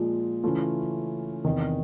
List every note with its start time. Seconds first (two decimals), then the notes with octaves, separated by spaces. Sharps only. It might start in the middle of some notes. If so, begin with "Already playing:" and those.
Already playing: A#2 F3 G#3
0.44 C#3 E3 A3 C#4 F4
1.45 E2 C3 D#3